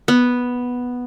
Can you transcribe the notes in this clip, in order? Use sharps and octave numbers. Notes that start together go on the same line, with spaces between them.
B3